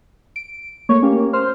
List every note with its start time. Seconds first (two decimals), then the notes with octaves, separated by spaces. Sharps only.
0.36 D7
0.89 A3 A#3 C#5
1.03 A#3 C#4 G4
1.33 C5 F6